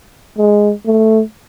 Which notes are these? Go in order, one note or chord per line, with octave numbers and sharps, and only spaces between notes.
G#3
A3